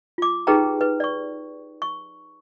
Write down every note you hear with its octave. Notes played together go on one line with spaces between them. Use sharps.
F4 D6
D#4 G4 G#4 B4 G5 A#5
B4
D5 C#6
C#6